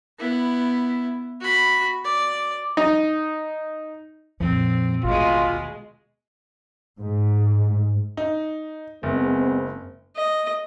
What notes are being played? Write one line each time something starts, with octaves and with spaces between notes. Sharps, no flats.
B3 E4
F#4 B5
D5
D#4
F2 A#2 F3 C4
A1 D#2 B2 G#3 F4
G#2
D#4
F#1 G#3 B3 C4
D#5